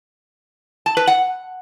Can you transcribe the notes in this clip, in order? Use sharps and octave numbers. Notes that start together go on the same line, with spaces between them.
A5
B4
F#5